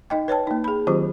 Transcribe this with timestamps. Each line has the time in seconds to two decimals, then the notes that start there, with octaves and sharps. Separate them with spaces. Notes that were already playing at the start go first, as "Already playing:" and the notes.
0.10 D#4 D#5 G5
0.28 B4 C#5 G5 A5
0.47 A#3 D#4
0.64 G#4 B5
0.87 D#3 F#3 C4 F4 G4 C5